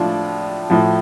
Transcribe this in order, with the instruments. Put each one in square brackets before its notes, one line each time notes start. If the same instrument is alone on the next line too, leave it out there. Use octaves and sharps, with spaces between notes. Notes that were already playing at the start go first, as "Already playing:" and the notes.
Already playing: [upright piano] A2 F3 D4 F4
A2 F3